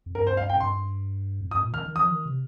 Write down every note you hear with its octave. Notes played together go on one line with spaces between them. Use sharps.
F2
G2 A#4
C5
F5
G5
A#2
G2 C6
F2
G2 D#6
A#2
D#3 F6
D#3
F3 D#6
D#3
C3